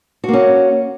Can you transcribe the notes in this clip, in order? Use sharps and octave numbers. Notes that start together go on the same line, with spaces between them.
A#3 C#4 F#4